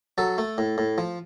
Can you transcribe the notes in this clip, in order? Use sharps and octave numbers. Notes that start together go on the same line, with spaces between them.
F#3 A4
A3
A2
A2
F3